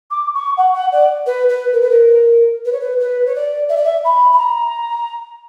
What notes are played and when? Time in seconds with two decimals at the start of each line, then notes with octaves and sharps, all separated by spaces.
0.10 D6
0.34 C#6
0.57 F#5
0.73 F#5
0.91 D5
1.26 B4
1.49 B4
1.72 A#4
1.80 B4
1.90 A#4
2.65 B4
2.72 C#5
2.80 B4
2.99 B4
3.25 C#5
3.35 D5
3.69 E5
3.76 D5
3.83 E5
4.04 B5
4.31 B5
4.38 A#5